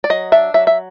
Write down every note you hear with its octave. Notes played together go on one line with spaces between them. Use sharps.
D5
F#3 D#5
D4 E5
F#3 E5
E5